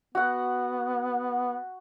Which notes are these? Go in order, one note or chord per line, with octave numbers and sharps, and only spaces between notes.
B3 F#4 F#5